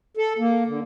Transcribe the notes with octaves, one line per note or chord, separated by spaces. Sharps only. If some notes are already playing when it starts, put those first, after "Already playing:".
A4
A#3
D3